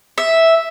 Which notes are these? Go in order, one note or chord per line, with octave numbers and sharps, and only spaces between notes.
E5